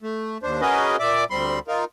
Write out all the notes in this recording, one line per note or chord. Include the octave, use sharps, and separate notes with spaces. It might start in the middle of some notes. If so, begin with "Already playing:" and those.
A3
D#2 D4 C5
C#4 F#4 G#4 A#4 B4 D#5
A#2 D5 E5 D6
D2 G3 C4 B5 C6
D#4 F4 A#4